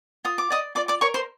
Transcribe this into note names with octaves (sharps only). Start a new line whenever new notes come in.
F4 D#6
D6
D5 D#5 D#6
F4 D5 D6
D5 D6
A#4 C#5 C#6
C5 C6